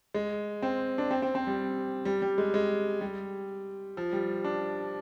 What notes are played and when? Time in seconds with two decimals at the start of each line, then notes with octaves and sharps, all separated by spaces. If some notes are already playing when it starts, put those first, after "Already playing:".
0.14 G#3
0.62 C4
0.98 D4
1.11 C4
1.22 C4
1.35 C4
1.47 G3
2.05 G3
2.22 G3
2.38 G#3
2.54 G#3
3.01 G3
3.97 F3
4.13 G3
4.44 D4